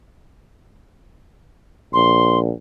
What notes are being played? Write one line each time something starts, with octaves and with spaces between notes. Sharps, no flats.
A#1 C6